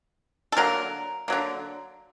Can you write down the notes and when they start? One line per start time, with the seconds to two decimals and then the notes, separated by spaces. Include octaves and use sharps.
0.52 A4
0.57 D3 F#3 A#3 A#4
1.28 D3 F#3 A#3